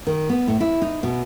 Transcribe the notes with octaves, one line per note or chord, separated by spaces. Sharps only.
D#3
B3
A2
E4
D#4
B2